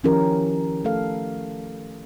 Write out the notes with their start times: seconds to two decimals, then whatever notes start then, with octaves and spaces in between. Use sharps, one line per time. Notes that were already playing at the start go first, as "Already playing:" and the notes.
0.04 D#3 F3 C#4 E4 G4 A#4
0.84 A3 A4 F5